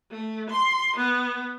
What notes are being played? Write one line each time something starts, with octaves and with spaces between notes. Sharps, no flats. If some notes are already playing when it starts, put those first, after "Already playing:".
A3
C6
B3